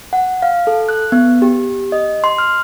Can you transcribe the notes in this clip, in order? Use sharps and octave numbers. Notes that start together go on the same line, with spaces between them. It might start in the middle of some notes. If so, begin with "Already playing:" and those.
F#5
F5
A4
F#6
B3
G4
D#5
C6
F6